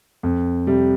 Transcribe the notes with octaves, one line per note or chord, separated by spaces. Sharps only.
F2
C3 G3